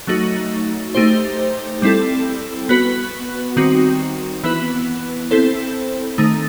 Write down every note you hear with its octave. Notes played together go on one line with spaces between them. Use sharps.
F#3 A3 D#4 F#4
A3 D#4 G4 C5
G3 C4 E4 A4
B3 F#4 B4
D#3 G3 C4 D#4 F#4
E3 B3 E4 B4
C4 E4 A4 C5
D#3 A3 D#4